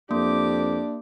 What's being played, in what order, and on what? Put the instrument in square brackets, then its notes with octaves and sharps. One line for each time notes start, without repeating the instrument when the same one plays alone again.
[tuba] F2 [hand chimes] A#3 [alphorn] D4 [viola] G4 D6